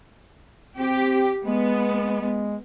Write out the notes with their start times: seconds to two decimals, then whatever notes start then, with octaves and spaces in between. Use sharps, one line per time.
0.77 C4 G4
1.44 G#3 B3
2.21 G#3